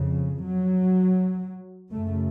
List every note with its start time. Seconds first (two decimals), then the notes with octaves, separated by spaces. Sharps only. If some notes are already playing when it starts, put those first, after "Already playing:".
Already playing: F2 C#3
0.42 F#3
1.93 F#2 C#3 A3